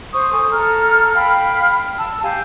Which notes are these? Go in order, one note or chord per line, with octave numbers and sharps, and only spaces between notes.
C5 C#6 D#6
A4 G#5
A4 A#5 F6
F5 G5 B5 F6
A5 E6
G4 F5 G#5